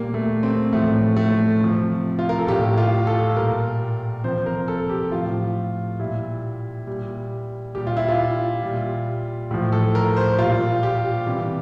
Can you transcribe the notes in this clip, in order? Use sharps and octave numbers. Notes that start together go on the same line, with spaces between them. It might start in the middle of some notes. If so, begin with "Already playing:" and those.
Already playing: A#2 G3 A#3
A3
C4
A2 F3 A3
A3
C3 F3
F4
A#4
A4
A2 G3 G4
F4
A4
A#2 G3 A#4
C3 F3 C5
A#4
A4
G4
A2 F3 F4
A#2 G3 E4
A#2 G3
A#2 G3 G4
F4
E4
F4
A#2 G3
A2 F3
A4
A#4
C5
A#2 G3 F4
G4
C3 E3 G3